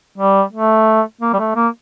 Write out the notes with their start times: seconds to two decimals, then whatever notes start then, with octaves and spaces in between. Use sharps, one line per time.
0.18 G3
0.53 A3
1.21 A#3
1.33 G3
1.39 A3
1.56 A#3